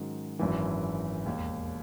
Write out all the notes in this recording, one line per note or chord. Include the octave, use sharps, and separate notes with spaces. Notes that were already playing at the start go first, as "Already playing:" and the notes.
Already playing: G#2 D#3 F#3 C#4
G#1 F#2 E3
E1 D#2 D#3